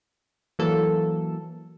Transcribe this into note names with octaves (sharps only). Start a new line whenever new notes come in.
E3 F#3 A#3 A4